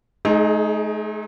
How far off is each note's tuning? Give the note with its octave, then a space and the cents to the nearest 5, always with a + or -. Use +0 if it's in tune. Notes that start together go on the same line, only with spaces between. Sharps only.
A3 -45 D#4 +0 G#4 +10